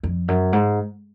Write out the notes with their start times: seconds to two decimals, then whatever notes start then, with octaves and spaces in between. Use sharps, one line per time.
0.03 F2
0.28 F#2
0.53 G#2